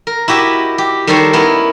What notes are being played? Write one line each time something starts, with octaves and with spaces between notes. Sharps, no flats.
A#4
E4 F#4 G4 D#5 E5
G4
D#3 G3 A4 A#4 C5 C#5
B3 C#4 E4 A#4